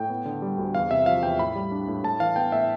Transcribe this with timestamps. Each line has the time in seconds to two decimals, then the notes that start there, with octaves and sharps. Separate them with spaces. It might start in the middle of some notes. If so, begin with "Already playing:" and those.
Already playing: A2 G5
0.10 B3
0.25 D3
0.42 G3
0.58 D2
0.75 E2 F5
0.91 C3 E5
1.06 F3 F5
1.23 E2 G5
1.39 A2 B5
1.55 G3
1.72 D4
1.88 A2
2.03 A2 A5
2.20 E3 F5
2.36 B3 G5
2.52 A2 E5